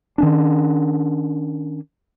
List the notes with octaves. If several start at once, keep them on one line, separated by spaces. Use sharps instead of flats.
D#3 C#4 D4